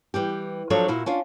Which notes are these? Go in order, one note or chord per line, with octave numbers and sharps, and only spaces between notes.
E3 G3 G4
F3 F#3 D4 A4 C#5
A#2 E4 F#4
C#4 D4 F4